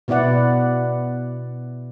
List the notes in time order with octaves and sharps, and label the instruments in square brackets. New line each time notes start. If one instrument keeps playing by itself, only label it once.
[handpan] B2 B3 E4 D5 F#5